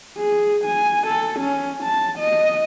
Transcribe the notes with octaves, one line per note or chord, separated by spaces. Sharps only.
G#4
G#5
A4
C#4
A5
D#5